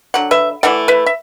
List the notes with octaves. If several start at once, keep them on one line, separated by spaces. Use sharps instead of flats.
D3 F#3 F#5
B4 E5
E3 A3 E4 D5 F#5
B4 E5
E5